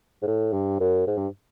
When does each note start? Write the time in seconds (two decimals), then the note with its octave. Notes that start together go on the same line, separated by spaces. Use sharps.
0.22 G#2
0.27 A2
0.53 G2
0.80 F#2
1.07 G#2
1.17 G2